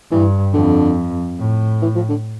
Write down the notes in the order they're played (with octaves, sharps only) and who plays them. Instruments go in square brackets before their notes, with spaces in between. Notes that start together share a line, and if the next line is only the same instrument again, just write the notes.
[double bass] G2 [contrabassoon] E3
[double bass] F2 [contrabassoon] D3
[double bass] A2
[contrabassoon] E3
F3
D3